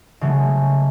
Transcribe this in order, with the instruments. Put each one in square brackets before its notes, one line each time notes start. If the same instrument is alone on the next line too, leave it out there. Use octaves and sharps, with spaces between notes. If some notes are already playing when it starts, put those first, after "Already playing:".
[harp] C#3 F#3 G#3 A3 C#4